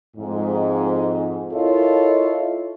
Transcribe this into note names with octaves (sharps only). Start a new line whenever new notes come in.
F2 G#2
E4 F4 A4 A#4 C#5 D#5